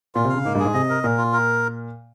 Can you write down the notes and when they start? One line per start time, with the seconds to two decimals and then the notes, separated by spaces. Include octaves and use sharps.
0.15 A#2 F4
0.25 C3
0.29 C#3 F5
0.45 G#2 A#3
0.55 G2
0.59 G#2 G#4
0.74 C3 D#5
0.90 A#4
1.03 A#2 A#4
1.18 F4
1.33 A#4